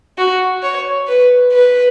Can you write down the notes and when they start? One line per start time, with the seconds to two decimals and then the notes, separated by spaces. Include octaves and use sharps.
0.18 F#4
0.63 C#5
1.08 B4
1.53 B4